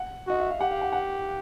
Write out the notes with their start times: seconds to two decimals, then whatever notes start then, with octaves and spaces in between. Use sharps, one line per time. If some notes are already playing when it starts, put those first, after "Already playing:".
Already playing: F#5
0.27 F#4 D#5
0.39 E5
0.50 F5
0.60 G4 F#5
0.71 F5
0.82 F#5
0.93 F#5